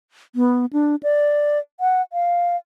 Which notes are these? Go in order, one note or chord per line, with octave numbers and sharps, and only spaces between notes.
B3
D4
D5
F#5
F5